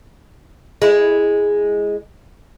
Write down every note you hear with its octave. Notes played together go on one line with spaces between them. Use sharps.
G#3 E4